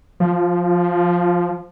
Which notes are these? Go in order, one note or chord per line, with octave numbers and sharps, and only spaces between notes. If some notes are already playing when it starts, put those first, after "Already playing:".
F3